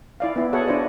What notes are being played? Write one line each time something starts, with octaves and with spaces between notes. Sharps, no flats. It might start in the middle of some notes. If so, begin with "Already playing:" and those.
E4 D5 F5
B3 E4
F#4 G#4 A4 C#5 F#5
D4 E4 C5 D5 D#5